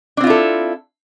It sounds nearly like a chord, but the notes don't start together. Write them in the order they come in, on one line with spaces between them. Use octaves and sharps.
D4 C4 F4 E4 A4